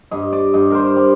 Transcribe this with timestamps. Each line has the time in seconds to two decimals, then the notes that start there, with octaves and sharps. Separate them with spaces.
0.11 G2 D#5
0.33 D5
0.54 G2 D#5
0.71 A#4 C5
0.96 G3